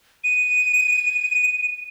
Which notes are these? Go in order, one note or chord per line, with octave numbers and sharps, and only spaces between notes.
D#7